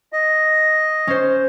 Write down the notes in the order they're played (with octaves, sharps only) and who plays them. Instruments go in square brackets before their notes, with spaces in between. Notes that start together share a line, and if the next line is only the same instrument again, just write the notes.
[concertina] D#5
[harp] C#4 C5